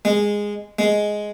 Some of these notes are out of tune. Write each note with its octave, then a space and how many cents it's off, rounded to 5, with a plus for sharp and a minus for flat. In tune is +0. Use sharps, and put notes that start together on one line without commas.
G#3 -10
G#3 +5